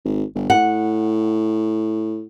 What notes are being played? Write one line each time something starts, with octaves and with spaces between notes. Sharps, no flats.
G#1
G1
A2 F#5